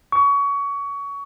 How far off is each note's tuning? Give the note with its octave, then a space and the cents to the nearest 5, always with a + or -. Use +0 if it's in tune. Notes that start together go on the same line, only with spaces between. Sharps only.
C#6 +25